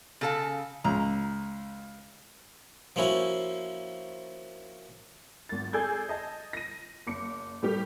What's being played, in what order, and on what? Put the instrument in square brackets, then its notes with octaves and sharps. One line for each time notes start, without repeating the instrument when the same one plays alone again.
[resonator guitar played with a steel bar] C#3 A4 F5
[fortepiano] C#2 [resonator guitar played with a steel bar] A#5
[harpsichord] F3 A#3 C#4 E4 F#4
[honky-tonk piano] G#1 A6
G#4 A4 D5 E6 G6 G#6
D#5 A5
A#6 D#7
F#1 D6 C#7
A2 G3 A3 A#3 G4